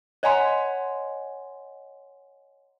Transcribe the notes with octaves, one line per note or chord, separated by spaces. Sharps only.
C#5 D#5 F#5 G#5 A#5 C6